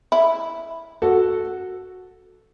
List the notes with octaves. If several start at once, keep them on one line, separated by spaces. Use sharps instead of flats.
E4
F#4 A4